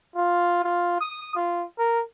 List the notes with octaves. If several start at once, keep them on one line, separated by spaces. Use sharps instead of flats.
F4
F4
D#6
F4
A#4